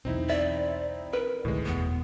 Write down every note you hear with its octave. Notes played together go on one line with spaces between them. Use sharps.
B1 E2 C4 D#4 E4
D5 E5
A#4 B4
D1 B1 A2 D#3 G#3
F#1 E2 B2 B3